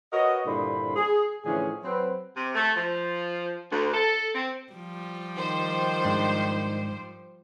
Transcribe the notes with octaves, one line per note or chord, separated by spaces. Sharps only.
F#4 A#4 B4 C#5 D#5
G2 A#2 D3 E4 C5 B5
G#4
A2 D3 E3 F3 C#4 G#4
F#3 C4 B4
C3
A3
F3
D2
A4
C4
F3 G3
D#3 C5
G#2 D4